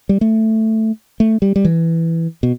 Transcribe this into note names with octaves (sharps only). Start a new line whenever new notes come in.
G3
A3
A3
G3
G3
E3
B2